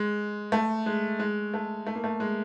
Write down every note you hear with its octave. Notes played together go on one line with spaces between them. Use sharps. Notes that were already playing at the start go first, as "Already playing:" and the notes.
Already playing: G#3
A3
G#3
G#3
A3
A3
A#3
A3
G#3